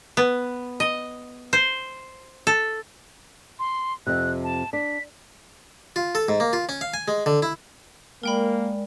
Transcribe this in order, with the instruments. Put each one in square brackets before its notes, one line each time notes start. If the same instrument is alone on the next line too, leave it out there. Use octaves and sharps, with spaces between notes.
[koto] B3
D#5
C5
A4
[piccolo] C6
[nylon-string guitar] F2 C3 [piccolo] F#6
[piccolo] A5
[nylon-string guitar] D4 [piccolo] B6
[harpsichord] F4
A4
G#2
A#3
F4
C#4
F5
G#5
G#3
D3
E4
[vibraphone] G#3 D5 [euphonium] A#3 [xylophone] A#4 G5 B5